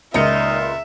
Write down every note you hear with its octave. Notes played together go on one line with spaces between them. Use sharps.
C#2 A#2 D#4 F4 E5 C#7